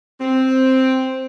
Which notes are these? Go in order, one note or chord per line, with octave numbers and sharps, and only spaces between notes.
C4